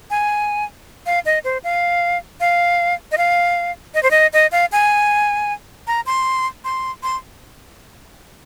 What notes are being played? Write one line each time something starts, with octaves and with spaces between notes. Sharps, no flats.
G#5
F5
D#5
C5
F5
F5
D#5
F5
D#5
C5
D#5
D#5
F5
G#5
A#5
C6
C6
C6